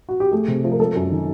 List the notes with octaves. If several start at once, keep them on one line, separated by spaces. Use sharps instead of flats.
F#4
G4
A3 G#4
C3
F3
A#4
G#3 A4
F#2
D#3